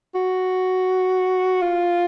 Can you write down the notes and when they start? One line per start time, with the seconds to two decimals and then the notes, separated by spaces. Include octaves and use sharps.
0.15 F#4
1.62 F4